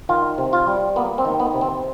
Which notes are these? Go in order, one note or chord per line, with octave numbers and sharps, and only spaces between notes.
D#3 F4
C3
F4
G3
A#3 B3
C4
D#3
B3
C3
C4